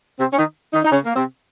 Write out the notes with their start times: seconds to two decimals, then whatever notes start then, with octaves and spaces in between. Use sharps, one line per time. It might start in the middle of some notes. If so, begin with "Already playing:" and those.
0.19 C3 C4
0.32 C#4
0.37 D#3 D#4
0.73 D#3 D#4
0.85 D#4
0.91 C#3 C#4
1.04 A#3
1.15 C3 C4